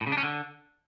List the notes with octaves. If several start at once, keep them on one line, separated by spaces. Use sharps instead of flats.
A2
C#3
D4
C#4
D3